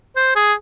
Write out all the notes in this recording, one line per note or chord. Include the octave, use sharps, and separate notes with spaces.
C5
G#4